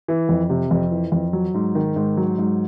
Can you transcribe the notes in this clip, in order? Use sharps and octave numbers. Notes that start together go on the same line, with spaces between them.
E3
F2
C3
F2
E3
F2
F#3
G#2
D#3
G#2
F#3
G#2